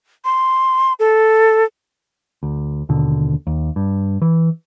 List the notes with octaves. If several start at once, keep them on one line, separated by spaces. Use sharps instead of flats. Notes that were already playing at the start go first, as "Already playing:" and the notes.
C6
A4
D2
D#2 B2 D3
D#2
G2
E3